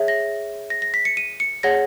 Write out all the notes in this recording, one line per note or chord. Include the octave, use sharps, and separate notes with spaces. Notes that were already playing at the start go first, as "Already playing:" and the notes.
Already playing: G#4 C#5 E5
A#6
A#6
A#6
B6
C#7
D#7
C#7
G#4 C#5 F#5 A#6